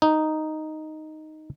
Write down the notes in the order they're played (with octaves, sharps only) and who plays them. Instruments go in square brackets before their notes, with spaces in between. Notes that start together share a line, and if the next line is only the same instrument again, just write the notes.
[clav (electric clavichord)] D#4